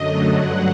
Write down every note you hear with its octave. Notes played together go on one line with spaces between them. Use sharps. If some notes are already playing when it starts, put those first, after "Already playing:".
Already playing: F#2 D3 F#3 A3 D#5
G2 D3 F#3 F#5